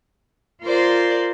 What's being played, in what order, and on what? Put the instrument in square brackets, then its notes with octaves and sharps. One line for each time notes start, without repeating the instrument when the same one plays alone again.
[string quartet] F4 A#4 C5 D5